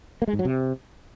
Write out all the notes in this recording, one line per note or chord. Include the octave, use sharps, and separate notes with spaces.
A#3
G#3
G#2
F#3
C3